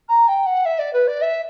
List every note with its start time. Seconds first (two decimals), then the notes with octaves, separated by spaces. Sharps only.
0.08 A#5
0.28 G5
0.46 F#5
0.65 E5
0.79 D5
0.93 B4
1.07 D5
1.21 E5